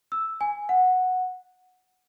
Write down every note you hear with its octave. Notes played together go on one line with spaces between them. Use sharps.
E6
G#5
F#5